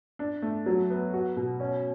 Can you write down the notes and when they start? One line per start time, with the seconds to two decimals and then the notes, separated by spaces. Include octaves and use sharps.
0.19 D4
0.42 A3
0.66 F#3
0.90 B3
1.14 F#4
1.36 B2
1.60 C#4